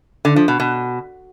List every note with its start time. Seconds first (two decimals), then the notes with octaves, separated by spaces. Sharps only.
0.25 D3
0.36 F3
0.48 B2
0.60 B2